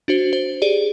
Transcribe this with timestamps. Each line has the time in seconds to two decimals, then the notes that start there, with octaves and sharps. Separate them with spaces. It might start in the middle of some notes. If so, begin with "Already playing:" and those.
0.08 D4 F#4 C5
0.33 C5
0.62 G4 G#4 D5